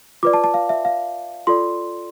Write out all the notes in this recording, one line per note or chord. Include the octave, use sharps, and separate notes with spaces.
F4 B4 D5 D6
A5
A5
F5
E5
F5
F4 A4 D5 C6